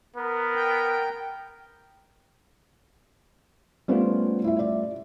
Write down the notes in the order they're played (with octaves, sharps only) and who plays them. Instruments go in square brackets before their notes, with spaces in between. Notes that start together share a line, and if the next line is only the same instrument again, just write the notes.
[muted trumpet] B3 [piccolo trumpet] A#4
[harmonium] G5
[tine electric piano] G3 A3 F4 [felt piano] B3 C#4 C5
[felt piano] E4 E5
D5